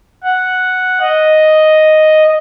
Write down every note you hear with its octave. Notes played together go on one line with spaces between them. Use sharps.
F#5
D#5